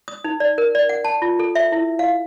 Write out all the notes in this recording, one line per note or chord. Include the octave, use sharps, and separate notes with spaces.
D#6
D#4
D5
A#4
D5
F#5
A5
F4
A4
E5
E4
F5